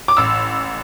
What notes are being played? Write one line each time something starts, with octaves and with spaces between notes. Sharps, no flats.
D6
A1 E6